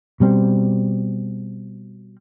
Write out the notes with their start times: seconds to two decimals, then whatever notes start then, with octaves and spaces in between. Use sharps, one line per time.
0.20 B2 G3 C4